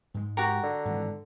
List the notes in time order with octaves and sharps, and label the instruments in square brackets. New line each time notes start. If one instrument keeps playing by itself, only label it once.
[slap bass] G#2 G#3
[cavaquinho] F#4 A#4 [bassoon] G4
[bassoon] D3
[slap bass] G#2 D#3 E3